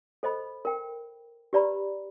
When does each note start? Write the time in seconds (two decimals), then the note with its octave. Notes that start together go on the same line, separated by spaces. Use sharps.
0.23 A4 C5 D#5 B5
0.65 A#4 G5
1.53 G4 B4 D5 A#5 B5